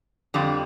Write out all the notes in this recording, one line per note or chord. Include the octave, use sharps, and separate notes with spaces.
F2 D3 G3